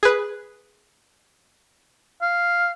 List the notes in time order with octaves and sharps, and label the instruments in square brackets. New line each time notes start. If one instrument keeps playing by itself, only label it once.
[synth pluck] G#4 B4
[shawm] F5